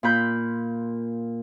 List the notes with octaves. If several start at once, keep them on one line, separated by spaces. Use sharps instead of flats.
A#2 F4 B5 G6